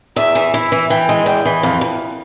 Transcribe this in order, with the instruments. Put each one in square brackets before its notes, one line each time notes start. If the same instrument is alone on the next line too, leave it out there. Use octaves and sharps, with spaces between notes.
[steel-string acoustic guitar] E2 [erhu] E5
[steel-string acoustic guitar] E3
E4
E3
[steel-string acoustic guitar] E3 [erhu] G5
[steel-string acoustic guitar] G#3
[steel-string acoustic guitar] E2 [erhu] G5
[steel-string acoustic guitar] E3
[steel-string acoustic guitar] F2 [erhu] F5
[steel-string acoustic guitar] F2